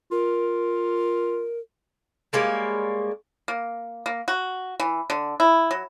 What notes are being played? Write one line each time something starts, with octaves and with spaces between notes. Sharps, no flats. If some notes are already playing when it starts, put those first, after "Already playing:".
F4 A#4
G3 G#3 A#3 C#5
A#3
A#3
F#4
E3
D3
E4
F#3